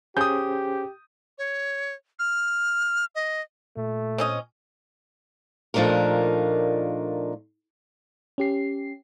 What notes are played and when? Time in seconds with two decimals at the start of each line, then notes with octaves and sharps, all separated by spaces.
0.17 C#4 G4 G#4 C5 D#6 G6
1.38 C#5
2.19 F6
3.15 D#5
3.77 A#2 A3
4.18 C4 C#4 D#5
5.74 A#2 F3 A3 D4 D#4 A#4
8.38 C#4 G4 C7